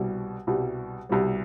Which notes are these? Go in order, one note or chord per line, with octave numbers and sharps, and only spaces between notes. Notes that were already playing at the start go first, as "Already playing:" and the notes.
Already playing: C2 B2 G3
C2 B2 G3
C2 B2 G3